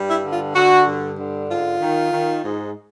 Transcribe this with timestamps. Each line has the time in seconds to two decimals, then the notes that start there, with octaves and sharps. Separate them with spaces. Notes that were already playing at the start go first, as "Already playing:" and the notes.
Already playing: G2 G3
0.08 E4
0.24 D3
0.32 F4
0.55 D3 F#4
0.86 G2
1.18 D3
1.49 G#2 F4
1.80 D#3
2.12 D#3
2.43 G#2